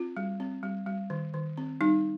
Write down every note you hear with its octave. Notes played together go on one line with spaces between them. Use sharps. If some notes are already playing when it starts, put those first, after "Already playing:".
Already playing: C4 F4
G3
C4
G3
G3
D#3
D#3
C4
G3 D#4